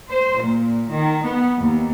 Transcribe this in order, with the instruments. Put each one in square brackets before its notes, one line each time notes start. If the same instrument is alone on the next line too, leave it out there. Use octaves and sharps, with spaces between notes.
[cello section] C5
A#2
D#3
B3
D#2